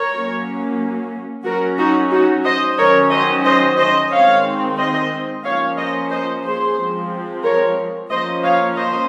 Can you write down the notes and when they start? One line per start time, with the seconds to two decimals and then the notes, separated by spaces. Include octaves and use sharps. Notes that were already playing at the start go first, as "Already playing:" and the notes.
Already playing: A#4 C#5
0.12 F#3 A#3 C#4
1.45 F#3 C#4 F#4 A#4
1.78 D#4 F#4
2.11 D#4 F#4
2.45 C5 D#5
2.78 D#3 F#3 C#4 A#4 C#5
3.11 C5 D#5
3.44 C5 D#5
3.78 C5 D#5
4.11 D#3 G#3 C4 C#5 F5
4.77 C5 D#5
5.44 F3 A#3 C#4 C#5 F5
5.77 C5 D#5
6.10 C5 D#5
6.43 G#4 C5
6.77 F3 G#3 C4
7.44 A#4 C#5
8.10 F3 A#3 C#4 C5 D#5
8.43 C#5 F5
8.76 C5 D#5